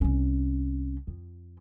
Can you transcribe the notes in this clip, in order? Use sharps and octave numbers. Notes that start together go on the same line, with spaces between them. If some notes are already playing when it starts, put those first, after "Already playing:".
C2 C#4
F2